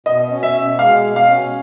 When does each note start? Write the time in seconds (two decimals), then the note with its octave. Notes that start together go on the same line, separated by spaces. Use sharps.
0.06 B2 D#5
0.31 C#4
0.43 E5
0.55 B2
0.79 G#3 F5
1.04 B2
1.16 F5
1.28 C#4